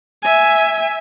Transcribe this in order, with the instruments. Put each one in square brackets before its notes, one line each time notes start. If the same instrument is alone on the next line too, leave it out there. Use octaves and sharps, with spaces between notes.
[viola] E5 G#5